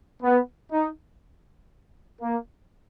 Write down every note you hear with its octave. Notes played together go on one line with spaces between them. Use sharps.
B3
D#4
A#3